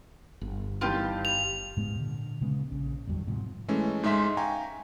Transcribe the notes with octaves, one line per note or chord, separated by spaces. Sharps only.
G1
G2 D#3 E3 F4 G4
F7
G#2 G#3 B3
A#2 D3
C#3 G#3 B3 C#4
A#1 C#3
G1 E2 G2 F#3
G#2 C3 F3
E3 G#3 A3 C#4
G#2 G#3 D#4 E5 C6 B6
F5 G5 G#5 A#5 C#6